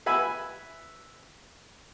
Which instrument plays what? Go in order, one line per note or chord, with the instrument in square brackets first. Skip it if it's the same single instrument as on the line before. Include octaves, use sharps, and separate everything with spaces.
[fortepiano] B4 E5 G#5 B5